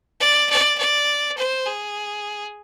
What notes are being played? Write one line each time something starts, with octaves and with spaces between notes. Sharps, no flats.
D5
D5
D5
C5
G#4